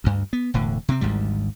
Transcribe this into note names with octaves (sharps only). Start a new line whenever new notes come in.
D2 G2
B3
E1 A2 D3
C3 C4
G#1 D2 G#2 G3